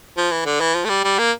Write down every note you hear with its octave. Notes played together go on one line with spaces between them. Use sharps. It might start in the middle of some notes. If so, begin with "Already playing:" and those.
F3
E3
D3
E3
F3
A3
G3
G3
A#3